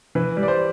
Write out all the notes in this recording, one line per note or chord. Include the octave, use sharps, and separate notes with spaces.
E3 B4
G3
D5
C5